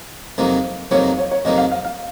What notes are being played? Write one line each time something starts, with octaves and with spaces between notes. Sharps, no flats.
F2 C3 F#3 A#3 D#4
F2 C3 F#3 A#3 D#4 C#5
C#5
C#5
F2 C3 F#3 A#3 D#4 D#5
F5
F5
F5